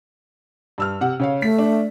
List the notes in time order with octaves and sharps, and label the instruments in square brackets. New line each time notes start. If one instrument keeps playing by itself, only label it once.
[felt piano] G2 E6 F6
C3 F#5
C#3 C#5 F5
[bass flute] A3 [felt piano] B6
[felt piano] D4